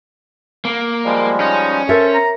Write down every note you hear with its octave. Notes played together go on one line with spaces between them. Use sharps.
A#3
F3 G3 G#3
C#4 D#4
A4 A#4 C5 C#5 E5
A#5